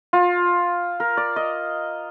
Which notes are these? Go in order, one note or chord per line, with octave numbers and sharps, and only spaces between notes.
F4
A#4
D5
D#5